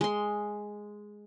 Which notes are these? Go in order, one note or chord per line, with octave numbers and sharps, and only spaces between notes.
G#3 C6